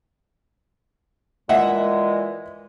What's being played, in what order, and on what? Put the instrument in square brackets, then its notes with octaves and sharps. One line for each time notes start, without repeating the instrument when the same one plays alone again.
[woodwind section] A#2 E3 G#3 [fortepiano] D#5 E5 F#5